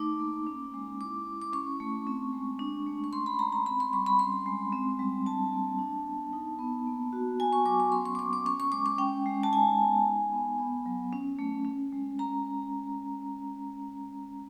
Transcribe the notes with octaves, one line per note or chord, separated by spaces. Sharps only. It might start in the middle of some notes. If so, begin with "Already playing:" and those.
Already playing: A3 D#4 D6
A#3
C#4
G#3
E4 D6
E4
D6
C#4 C#6
A3
C4
G#3
D4
A3
C#6
C#4 C6
B5
G#3 A#5
A#5
C4 B5
C6
G3 C#6
B5
C#4 C6
G#3
C4
G3
D4 A5
A#3
D4
B3
D#4
B3
A#3
F#4
B3 G#5
C#6
F#3 D6
C#6
C#4 C6
C#6
D6
A#3 C#6
D6
C#4 C#6
C#6
G#3 D6
C#6
C#4 G5
G#3
A5
D#4 G#5
B3
D#4
B3
B3
F#3
C#4
A3
C#4
G#3
C#4 A#5